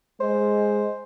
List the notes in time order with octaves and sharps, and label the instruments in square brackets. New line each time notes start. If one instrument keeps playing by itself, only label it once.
[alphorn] G#3 [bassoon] C5